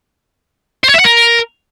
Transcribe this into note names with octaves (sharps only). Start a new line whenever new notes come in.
C5
C#5
E5
F#5
A#4